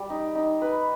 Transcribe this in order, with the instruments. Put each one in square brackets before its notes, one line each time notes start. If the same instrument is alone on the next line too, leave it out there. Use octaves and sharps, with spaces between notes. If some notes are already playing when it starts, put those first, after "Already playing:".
Already playing: [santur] G3
D#4
D#4
B4